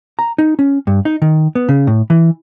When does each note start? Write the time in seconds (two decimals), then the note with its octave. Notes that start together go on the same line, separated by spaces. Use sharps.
0.19 A#5
0.38 D#4
0.59 C#4
0.87 G2
1.05 D#4
1.22 D#3
1.55 B3
1.69 C#3
1.87 A2
2.10 E3